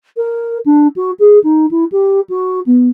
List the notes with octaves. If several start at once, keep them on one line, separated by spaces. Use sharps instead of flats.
A#4
D4
F#4
G#4
D#4
E4
G4
F#4
B3